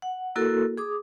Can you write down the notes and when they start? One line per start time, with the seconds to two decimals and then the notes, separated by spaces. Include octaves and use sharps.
0.02 F#5
0.36 A#3 E4 F#4 A4 A#4
0.78 G#4 D6 D#6